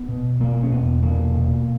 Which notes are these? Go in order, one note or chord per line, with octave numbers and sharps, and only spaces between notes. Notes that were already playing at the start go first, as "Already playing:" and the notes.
Already playing: B3
B2
B2 A#3
C#4
E2 B3
B2 A#3
B2